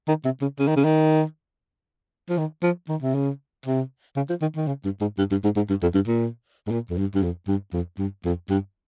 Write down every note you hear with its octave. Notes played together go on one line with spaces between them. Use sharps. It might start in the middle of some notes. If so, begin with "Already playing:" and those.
D#3
C3
C#3
C#3
D#3
C#3
D#3
F3
D#3
F3
D#3
C3
C#3
C3
C#3
F3
D#3
D#3
C#3
G2
G#2
G2
G2
G#2
G#2
G2
F2
G2
A#2
G#2
A#2
F2
G2
G2
F2
G2
F2
G2
F2
G2